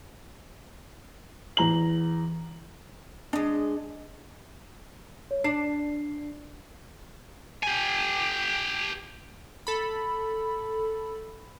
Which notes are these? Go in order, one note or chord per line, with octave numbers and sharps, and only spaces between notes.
E2 A#5 F#7
G#3 D4 D#5
C#5
D4 C7
G4 G#5
A4 B5